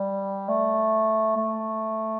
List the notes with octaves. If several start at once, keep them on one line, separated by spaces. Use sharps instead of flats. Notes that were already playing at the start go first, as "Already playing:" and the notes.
Already playing: G3
A3
A3